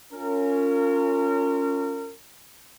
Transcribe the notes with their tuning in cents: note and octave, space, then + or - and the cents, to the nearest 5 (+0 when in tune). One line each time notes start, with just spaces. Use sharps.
C#4 +10 F4 +0 A#4 -30